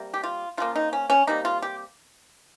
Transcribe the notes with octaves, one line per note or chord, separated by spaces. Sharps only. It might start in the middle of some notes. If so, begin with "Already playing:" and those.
Already playing: C3 G3 A#3
G4
F4
C#3 F3 A#3 F4
D#4
C#4
C#4
C3 G3 A#3 D#4
F4
G4